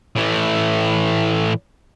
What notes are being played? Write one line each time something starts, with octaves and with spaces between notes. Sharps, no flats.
A2 E3